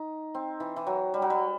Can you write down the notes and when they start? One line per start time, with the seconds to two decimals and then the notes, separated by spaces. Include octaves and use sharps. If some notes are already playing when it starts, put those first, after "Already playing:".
Already playing: D#4
0.34 C4
0.60 E3
0.76 E3
0.87 F#3
1.14 G3
1.22 F#3
1.30 G3